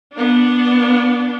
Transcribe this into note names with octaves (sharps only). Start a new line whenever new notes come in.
B3 D4